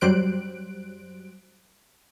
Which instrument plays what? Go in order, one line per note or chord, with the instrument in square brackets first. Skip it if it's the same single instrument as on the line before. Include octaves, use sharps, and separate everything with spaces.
[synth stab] F#2 F#3 G3 C5 F#6 D7